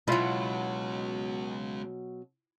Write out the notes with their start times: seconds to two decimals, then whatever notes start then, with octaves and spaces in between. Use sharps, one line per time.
0.08 B2 F#3 G#3 C#4 E4 F4